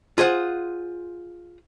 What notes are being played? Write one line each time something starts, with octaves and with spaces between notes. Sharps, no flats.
F4 G#4 C5 F#5